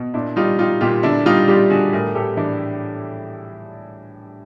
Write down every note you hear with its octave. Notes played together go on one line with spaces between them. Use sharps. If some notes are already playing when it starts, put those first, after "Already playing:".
Already playing: B2
A#2 D4 E4
G3 D#4 F4
G3 D#4 F4
A#2 F4 G4
D3 D4 E4
G3 D#4 F4
G3 F4 G4
D3 F#4 G#4
A2 G#4 A#4
A2 G4 A4
E3 D4 E4